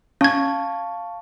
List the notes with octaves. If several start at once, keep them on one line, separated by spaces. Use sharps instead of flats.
C#4 F5 A5 C#6 G#6